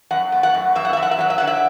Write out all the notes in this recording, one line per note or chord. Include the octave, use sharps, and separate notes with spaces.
F#2 F#5
A3
F#5
F#2
F#2 E5
F#5
F#2 E5
F#5
E5
F#3 F#5
E5
D3 F#5
E5